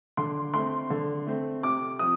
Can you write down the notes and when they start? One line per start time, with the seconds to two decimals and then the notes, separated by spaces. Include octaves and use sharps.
0.17 D3 C6
0.54 A3 C4 C6
0.90 D3
1.27 A3 C4
1.63 C3 D6
1.99 F3 C4 D#6